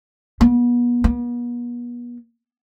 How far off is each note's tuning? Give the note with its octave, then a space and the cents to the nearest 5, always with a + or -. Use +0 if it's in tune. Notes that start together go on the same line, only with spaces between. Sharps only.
B3 -35
B3 -40